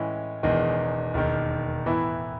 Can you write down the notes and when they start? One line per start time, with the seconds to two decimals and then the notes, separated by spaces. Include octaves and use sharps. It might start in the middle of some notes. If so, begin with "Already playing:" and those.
Already playing: A2 E3 G#3 C#4
0.43 E1 E2 D#3 G#3
1.14 E1 D#2 D#3
1.86 A2 E3 B3 E4